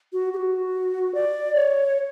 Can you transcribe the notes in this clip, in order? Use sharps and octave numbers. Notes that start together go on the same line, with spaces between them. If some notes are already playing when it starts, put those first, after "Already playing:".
F#4
G4
F#4
D5
C#5